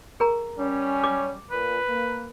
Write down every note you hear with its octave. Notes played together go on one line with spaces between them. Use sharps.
G#4 A#4 A#5
G3 C#4
D6
A#2 B4
A#3